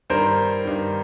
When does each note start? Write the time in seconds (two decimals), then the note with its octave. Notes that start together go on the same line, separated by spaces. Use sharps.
0.10 G2 D#3 A#4 C5
0.65 G2 D#3